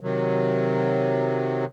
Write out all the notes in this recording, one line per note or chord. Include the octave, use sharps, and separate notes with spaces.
C3 D#3 F#3